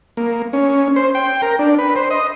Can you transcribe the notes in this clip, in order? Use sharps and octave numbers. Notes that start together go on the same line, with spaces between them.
A#3
C#4
C5
G5
A#4
D4
B4
C5
D#5